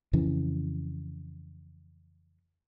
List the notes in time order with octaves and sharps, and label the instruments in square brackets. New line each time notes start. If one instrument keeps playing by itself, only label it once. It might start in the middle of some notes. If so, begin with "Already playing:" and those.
[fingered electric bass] F2 C#3 E3